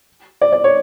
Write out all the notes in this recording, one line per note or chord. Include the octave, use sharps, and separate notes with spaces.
D5
D5
C#5